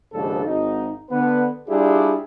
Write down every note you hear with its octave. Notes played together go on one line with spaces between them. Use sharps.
A#1 D#2 G#2 C#3 D4 A4
G#1 D#4
D3 B3 B4
G3 D4 E4 F4 G4 G#4